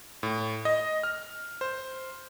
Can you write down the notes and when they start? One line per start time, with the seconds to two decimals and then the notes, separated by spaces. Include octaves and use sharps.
0.23 A2
0.65 D#5
1.03 F6
1.61 C5